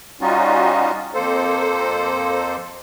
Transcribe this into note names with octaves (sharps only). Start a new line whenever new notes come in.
G3 C#4 D#4 F4 F#4
F2 A#3 A4 C5